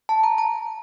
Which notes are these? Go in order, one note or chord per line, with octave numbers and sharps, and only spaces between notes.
A5
A#5
A#5